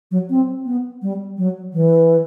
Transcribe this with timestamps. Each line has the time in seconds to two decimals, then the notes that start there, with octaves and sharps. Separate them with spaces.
0.11 F#3
0.30 C4
0.66 B3
1.02 G3
1.38 F#3
1.73 E3